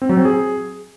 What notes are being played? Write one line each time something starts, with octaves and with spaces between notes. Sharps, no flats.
C4
F#3
C4
G#4